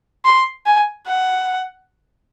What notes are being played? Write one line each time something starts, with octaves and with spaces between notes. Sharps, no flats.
C6
G#5
F#5